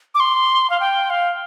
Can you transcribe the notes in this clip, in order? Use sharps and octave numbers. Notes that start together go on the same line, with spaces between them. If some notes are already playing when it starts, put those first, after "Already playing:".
D6
C6
F5
G5
F5